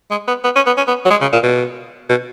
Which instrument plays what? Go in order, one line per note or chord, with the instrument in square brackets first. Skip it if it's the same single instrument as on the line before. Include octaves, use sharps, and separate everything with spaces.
[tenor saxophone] G#3
B3
B3
C#4
B3
C#4
B3
F#3
G#3
C#3
A#2
B2
B2